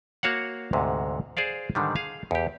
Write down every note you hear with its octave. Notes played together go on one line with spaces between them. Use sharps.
A#3 F#4 C#5 F5 F#5
D2 G#2 C3
G#4 C5 D5 F5
G#2 D3 D#3 G3
G#4 F5
E2 G4